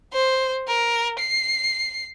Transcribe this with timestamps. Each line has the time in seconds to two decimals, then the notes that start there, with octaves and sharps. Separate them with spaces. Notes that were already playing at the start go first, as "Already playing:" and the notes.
0.13 C5
0.68 A#4
1.19 C7